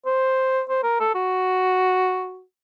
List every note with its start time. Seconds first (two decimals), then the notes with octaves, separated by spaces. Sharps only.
0.06 C5
0.69 C5
0.83 A#4
1.00 A4
1.15 F#4